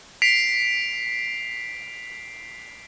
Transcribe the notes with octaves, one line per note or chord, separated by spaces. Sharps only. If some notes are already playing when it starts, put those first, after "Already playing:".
B6 C7 D7 F7